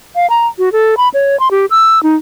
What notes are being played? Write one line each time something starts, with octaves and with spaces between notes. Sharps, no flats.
F5
A#5
F#4
A4
B5
C#5
C6
G4
E6
D#4